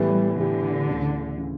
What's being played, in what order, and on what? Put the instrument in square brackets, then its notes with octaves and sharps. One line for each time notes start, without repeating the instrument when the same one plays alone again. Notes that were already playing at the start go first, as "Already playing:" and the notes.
Already playing: [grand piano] A2 E3 B3 E4 G4 [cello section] G3
[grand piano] A2 E3 B3 E4 G4 [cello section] D3
[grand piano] D2 C#3 E3
C#3 E3